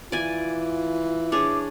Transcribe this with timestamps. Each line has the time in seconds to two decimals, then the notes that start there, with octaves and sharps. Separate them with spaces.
0.12 E3 F4 D5 G#5
1.32 D4 G#4 C#5 D6